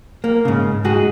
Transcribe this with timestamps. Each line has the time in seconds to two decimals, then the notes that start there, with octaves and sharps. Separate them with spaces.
0.24 A#3
0.45 G#2 C#3
0.85 G#2 F#4 G#4